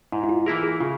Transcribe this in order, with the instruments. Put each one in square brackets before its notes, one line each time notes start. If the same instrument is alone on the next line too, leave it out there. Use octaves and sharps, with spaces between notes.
[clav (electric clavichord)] G#2 [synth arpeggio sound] E4
[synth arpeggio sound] E4
F4
[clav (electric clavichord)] E3 A#3 E4 A#4 [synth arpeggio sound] G#4
[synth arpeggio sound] G#4
[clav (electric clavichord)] C#3 [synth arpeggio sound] F4